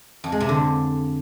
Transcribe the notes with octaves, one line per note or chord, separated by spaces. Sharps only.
F2
G#3
C3
D3